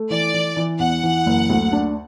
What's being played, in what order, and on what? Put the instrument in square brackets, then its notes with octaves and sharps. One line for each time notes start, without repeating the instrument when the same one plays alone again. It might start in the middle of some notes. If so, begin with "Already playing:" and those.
Already playing: [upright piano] A3
[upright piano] E3 [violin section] D5
[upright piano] E3
E3
[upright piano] E2 [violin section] F#5
[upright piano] E3
F#1
D2
D4